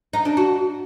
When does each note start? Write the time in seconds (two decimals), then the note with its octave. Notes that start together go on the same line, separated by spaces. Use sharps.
0.13 D#4
0.25 D4
0.37 F#4